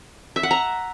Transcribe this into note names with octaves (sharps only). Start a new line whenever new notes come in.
E5
F#5
A#5